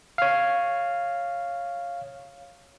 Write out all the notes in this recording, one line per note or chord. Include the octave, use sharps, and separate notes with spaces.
C#5 F5